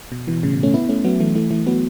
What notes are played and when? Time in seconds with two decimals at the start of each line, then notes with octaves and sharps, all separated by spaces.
0.12 B2
0.27 B2 E3
0.43 A2 C#3
0.53 B2
0.63 A3 C#4
0.74 B3 E4
0.89 A3 C#4
1.04 F#3 B3
1.20 E3 A3
1.35 E3 A3
1.50 E3 A3
1.67 F#3 B3